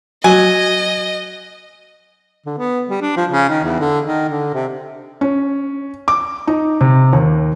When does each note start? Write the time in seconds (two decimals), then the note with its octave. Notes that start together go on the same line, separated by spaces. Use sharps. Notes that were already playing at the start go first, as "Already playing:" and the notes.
0.24 F#3 D#5 G#5
2.46 D3
2.58 B3
2.89 G3
3.01 D4
3.16 F3
3.30 C#3
3.49 D#3
3.64 E2
3.79 D3
4.05 D#3
4.29 D3
4.54 C3
5.21 C#4
6.08 D6
6.47 D#4
6.81 C3
7.13 D#2